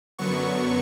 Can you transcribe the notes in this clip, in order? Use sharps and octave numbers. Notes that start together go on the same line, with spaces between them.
F#2 D3 F#3 B3 C#6